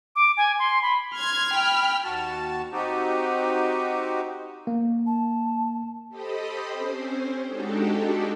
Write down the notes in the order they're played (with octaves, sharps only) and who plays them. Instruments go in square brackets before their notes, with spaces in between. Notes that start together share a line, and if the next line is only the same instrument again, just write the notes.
[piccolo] D6
G#5
C6
B5
[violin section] C6 G#6 [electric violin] F6
[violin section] G5 B5
[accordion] D#2 F#4 A5
C4 D#4 F#4 G4
[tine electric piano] A#3
[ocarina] A5
[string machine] G4 A4 C5 D#5 B5 D#6
C4 C#4 C5
G#3 D4 D#4 F#4 G4 A4